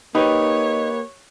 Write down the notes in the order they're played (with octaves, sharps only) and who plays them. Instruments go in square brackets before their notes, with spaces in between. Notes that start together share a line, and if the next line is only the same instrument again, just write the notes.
[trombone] A#3 [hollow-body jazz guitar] D#4 [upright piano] G4 B4 [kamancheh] C#5